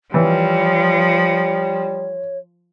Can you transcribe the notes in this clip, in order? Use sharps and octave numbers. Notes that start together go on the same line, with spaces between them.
E3 F3 G3 C#5